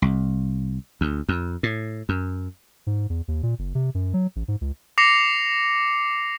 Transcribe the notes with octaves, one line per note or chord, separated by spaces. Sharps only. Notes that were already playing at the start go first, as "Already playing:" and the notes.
C2
D2
F2
A2
F#2
G#2
E2
D#2
A#2
F#1
C3
F#2
F#3
A1
G#2
C#2
D6 A#6 C7 C#7 F7